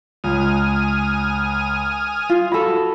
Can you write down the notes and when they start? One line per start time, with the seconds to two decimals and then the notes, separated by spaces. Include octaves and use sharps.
0.24 C#2 G#5 D#6 F6
2.29 F4
2.52 F#4 A4 B5